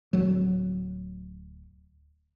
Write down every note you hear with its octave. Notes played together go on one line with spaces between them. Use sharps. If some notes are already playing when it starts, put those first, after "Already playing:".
D1 F#3